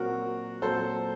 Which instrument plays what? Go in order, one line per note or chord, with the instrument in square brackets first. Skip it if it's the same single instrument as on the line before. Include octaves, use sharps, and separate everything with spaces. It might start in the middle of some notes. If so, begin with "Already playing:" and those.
Already playing: [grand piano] A#2 F#3 C4 F#4 A#4
A#2 F#3 C4 A4 C5